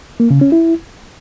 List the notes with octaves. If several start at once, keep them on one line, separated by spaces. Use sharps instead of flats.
A#3
C#3
C#4
E4